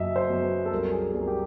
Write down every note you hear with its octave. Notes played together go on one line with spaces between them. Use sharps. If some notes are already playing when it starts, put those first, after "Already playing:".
Already playing: F#1 F#2 F#3 D#5 E5
C5
F#2
B4
A4
C2 A#4
G#4
C2 A#4
G4